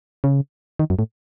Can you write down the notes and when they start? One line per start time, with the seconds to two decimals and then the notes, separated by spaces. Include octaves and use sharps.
0.24 C#3
0.79 D#3
0.90 F#2
0.99 A2